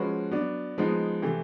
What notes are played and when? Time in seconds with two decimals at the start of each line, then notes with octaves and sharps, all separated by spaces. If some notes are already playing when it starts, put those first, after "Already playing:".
Already playing: F3 G#3 C#4 F#4 B4
0.31 F#3 B3 D4
0.78 F3 G#3 B3 D#4
1.22 C3 E3 A3